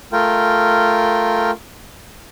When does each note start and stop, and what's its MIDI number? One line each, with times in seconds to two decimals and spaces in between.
0.12 1.51 57
0.12 1.51 65
0.12 1.51 70
0.12 1.51 79